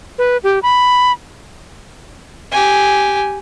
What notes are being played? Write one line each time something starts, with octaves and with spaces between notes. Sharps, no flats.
B4
G4
B5
G4 G#5